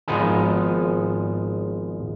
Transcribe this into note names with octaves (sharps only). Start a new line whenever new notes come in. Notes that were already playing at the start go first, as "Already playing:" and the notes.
G#1 F3 G#3 B3 D#4 G#4